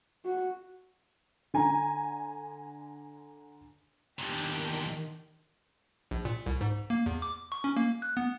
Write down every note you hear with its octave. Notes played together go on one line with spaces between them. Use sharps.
F#4
D3 G#5 A#5
E2 A#2 D#3 D4 G4
A#1
A#2
C2
G#2
A#3
E2
D6
C#6
C#4
A#3
F#6
B3